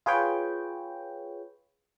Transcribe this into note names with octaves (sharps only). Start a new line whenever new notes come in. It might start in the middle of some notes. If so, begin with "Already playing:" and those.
F4 G#4 B4 C#5 G5